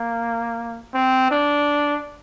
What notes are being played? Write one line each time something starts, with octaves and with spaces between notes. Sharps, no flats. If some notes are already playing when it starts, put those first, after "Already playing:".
Already playing: A#3
C4
D4